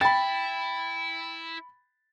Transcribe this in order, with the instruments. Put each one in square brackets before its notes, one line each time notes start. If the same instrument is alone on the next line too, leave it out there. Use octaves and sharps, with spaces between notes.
[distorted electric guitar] E4 [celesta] G5 [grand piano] B5 A6